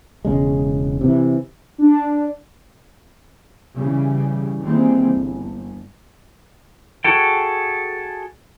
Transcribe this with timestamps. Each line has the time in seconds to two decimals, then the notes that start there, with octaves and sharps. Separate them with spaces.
0.25 E1 C#3 G#3
1.01 C3 E3
1.78 D4
3.75 C#3 E3 G3
4.60 D#3 E3 G3 G#3 A#3 C4
5.14 G1
7.04 F#4 G#4 A4 G5